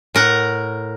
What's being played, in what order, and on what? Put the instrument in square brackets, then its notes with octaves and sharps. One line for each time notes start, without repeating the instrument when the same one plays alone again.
[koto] A2 A#4 F#5 A#5